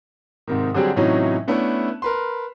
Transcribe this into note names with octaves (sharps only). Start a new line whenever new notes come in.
G#2 C3 D#3
D3 F#3 G3 C4 G4 G#4
A2 C3 E3 F#3 C#4 D#4
A3 B3 C#4 D4 E4
A#4 B4 C6